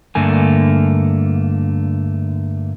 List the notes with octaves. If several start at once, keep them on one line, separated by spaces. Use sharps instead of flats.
G2 D3 A3 A#3 G#5